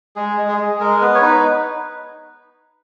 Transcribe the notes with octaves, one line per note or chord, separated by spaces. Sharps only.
G#3 G#4
G#3
G#4
G#3
G#3 A#4
B3 B4
C#5
D#4 B4